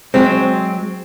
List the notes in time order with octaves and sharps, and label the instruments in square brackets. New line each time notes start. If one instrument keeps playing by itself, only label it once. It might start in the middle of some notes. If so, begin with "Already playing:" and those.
[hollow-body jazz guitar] F#3 G#3 C4